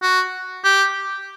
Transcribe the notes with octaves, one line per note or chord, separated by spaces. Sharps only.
F#4
G4